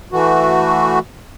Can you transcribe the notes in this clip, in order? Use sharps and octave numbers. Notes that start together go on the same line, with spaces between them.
E3 A3 F#4